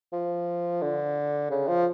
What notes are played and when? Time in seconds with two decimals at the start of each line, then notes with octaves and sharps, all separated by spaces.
0.13 F3
0.82 D3
1.51 C#3
1.68 F3